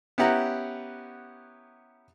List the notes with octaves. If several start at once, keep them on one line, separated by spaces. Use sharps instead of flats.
B3 C#4 E4 G4 F#5 A#5